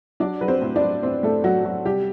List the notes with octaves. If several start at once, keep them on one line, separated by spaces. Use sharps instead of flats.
F#3 D4 D5
F#3 B4
C4 C5
A2
D4 D5
F#3
A2 C4 C5
A2 A3 A4
A2 F#3 F#4
F#3 F#4
C3 G3 G4